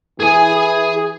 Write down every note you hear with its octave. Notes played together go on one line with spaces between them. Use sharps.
E3 G#4 G#5